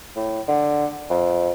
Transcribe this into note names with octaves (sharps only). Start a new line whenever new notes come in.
A2
D3
F2